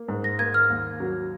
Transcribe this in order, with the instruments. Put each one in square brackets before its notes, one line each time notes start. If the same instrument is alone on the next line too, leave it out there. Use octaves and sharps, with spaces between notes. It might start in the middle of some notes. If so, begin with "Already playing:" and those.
Already playing: [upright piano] A#3
G#2
[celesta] A#6
[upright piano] A#3 [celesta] G#6
[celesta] F6
[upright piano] D#2
F#3